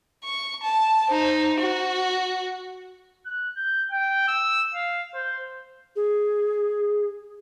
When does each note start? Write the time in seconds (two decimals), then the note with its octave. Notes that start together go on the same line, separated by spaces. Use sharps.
0.24 C#6
0.63 A5
1.10 D#4 C5
1.60 F#4
3.26 F#6
3.57 G6
3.91 G5
4.28 E6
4.74 F5
5.14 C5
5.96 G#4